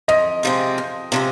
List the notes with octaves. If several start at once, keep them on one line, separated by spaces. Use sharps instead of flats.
F2 D#5
C3 F3 G#3 C4
F2
C3 F3 G#3 C4